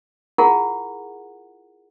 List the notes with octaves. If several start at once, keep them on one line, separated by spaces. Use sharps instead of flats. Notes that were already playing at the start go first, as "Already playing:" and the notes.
E4 F4 G#4 A#4 F#5